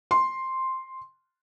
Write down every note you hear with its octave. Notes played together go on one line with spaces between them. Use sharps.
C6